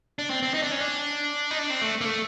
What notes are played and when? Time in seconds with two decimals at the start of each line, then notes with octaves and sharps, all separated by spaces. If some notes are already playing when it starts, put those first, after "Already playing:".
0.19 D4
0.30 C4
0.43 C4
0.54 D#4
0.62 D4
0.71 C#4
0.81 D4
1.51 D#4
1.59 D4
1.70 C4
1.82 A3
2.01 A#3
2.05 A3